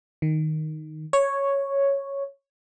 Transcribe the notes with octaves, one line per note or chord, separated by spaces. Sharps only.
D#3
C#5